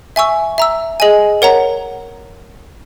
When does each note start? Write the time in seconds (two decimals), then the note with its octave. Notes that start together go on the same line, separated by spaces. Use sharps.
0.16 E5 G#5 C#6 E6
0.58 E5 A#5 E6
1.00 G#4 D#5 G#5
1.42 A#4 C#5 F#5 A#5